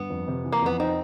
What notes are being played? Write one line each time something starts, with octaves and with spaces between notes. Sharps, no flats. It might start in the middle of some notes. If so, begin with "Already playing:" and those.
Already playing: G2 B3
F2
C3
E3
A#3
F2 B3
C4 D#4